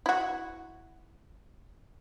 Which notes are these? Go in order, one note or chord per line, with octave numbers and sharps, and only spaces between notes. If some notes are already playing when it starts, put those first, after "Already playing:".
E4 F#4